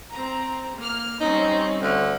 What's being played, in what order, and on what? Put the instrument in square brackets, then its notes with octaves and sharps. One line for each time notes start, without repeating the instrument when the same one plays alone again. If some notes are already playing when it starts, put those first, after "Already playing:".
[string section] C4 A#5
A#3 F6
[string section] G3 C4 C#4 [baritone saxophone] D#4
[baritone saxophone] D2